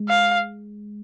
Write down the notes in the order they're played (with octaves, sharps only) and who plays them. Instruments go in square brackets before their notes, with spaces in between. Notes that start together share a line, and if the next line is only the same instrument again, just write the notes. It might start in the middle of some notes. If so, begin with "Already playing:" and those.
Already playing: [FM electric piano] G#3
[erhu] F5